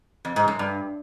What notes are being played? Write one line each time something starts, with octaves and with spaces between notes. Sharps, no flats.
F2
G#2
F#2
G2